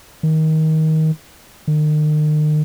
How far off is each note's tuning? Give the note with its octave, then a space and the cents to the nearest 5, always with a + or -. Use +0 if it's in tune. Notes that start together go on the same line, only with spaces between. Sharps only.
D#3 +20
D#3 -40